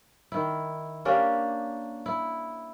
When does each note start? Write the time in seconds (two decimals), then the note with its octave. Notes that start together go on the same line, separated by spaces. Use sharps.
0.32 D#3 E4
1.05 A#3 C#4 D4 G4
2.06 E4